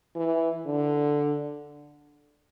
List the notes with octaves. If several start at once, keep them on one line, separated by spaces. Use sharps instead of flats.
E3
D3